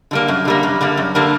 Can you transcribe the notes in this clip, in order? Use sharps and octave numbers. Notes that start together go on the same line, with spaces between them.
D3 G3 A#3
F#2
D3 G3 A#3
F#2
D3 G3 A#3
F#2
D3 G3 A#3